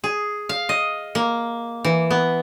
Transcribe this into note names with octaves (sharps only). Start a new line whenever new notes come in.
G#4
F5
D#5
A#3
E3
B3